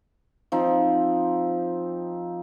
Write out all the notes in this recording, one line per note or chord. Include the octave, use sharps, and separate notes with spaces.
F3 C4 D#4